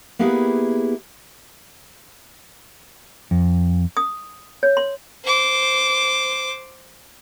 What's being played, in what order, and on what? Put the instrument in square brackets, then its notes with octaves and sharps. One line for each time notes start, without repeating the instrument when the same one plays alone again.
[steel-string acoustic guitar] A#3 B3 E4 G4 G#4 B4
[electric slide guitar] F2
[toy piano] D#6
C#5
C6
[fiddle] C5 D6